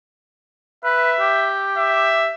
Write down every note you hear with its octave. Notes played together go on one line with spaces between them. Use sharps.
B4 E5
G4
E5